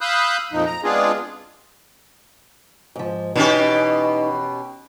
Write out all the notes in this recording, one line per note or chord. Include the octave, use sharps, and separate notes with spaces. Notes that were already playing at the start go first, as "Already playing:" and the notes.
F5 B5 D#6 E6 F#6 G6
F2 A#2 F3 D#4
A#5
G#3 B3 C4 D4 F4 G#4
G#2 F3
B2 E3 C#4 D#4 G4